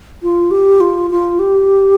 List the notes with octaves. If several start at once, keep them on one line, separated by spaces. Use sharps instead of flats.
F4
G4
F4
F4
G4